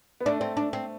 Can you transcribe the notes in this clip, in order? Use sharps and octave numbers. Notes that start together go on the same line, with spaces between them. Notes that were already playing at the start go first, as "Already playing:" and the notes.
B3
A3 D4
C4
D4
C4